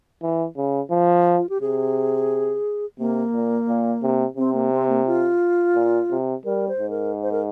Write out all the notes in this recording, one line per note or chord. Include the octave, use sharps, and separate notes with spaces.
E3
C#3
F3
F4
G4
C3 G#4
C3 A#3
A#2
A#2
C3
C3 C4
A#3
C4
A#3
F4
A#2
C3
G3 A#4
C5
G#2
A#4
C5
A#4